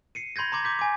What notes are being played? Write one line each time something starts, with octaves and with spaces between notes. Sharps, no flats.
C7 C#7 D#7
B5 C6 G6 G#6 A#6
A#5 C6 D6 G#6 A#6
D6 G6 B6
G#5 D6